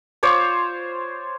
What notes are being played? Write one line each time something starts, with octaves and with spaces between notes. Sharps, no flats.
F4 C5 C#5 D6